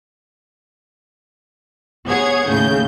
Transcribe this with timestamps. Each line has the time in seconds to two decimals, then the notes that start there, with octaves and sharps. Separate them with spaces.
2.07 B3 G#4 C#5 F#5 G#6
2.45 D#2 A2 C#3 G6